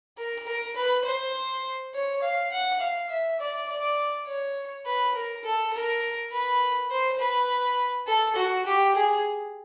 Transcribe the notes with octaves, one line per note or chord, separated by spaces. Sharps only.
A#4
A#4
B4
C5
C#5
F5
F#5
F5
E5
D5
D5
C#5
B4
A#4
A4
A#4
B4
C5
B4
A4
F#4
G4
G#4